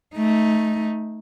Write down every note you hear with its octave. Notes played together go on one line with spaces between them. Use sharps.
A3 D#4